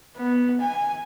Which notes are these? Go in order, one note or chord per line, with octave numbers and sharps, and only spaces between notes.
B3
G#5